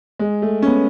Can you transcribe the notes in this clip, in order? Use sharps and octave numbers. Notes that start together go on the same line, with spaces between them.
G#3
A3
C#4
B3